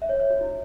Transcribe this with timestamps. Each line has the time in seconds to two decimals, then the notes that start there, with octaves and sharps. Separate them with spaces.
0.02 E5
0.09 C#5
0.20 C#5
0.30 F#4
0.41 E4